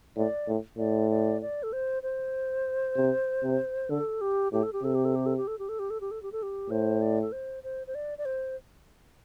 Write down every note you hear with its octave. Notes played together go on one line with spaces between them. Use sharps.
A2 D5
A2
A2 D5
D5
D5
A4
C5
C5
C3
C3
D3 A4
G4
A2 G4
A4
G4
C3 A4
G4
A4
G4
A4
G4
A4
G4
A4
G4
A4
G4
A4
G4
A4
G4
A2 C5
D5
A4
C5
C5
C5
D5
D5
C5